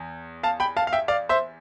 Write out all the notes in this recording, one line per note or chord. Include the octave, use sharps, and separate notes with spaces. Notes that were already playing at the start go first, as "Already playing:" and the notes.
Already playing: E2
F5 A5
G5 B5
F5 A5
F5
E5 G5
D5 F5
C5 E5